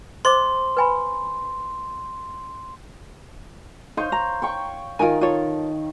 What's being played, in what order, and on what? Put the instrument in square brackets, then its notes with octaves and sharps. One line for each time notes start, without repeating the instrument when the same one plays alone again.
[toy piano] C5 D#5 D6 [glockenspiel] C6
[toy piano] B4 G#5 B5
[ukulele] D#4 [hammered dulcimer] C5 C#5 F5
[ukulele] A#5
[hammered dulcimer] C#5 G5 C#6
[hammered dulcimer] D#3 [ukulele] F4 A#4 G#5
[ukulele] F4 A4 C#5